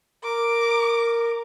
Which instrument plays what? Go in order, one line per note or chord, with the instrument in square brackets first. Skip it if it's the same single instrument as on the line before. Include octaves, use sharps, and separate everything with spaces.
[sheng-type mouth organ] A#4 [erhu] D6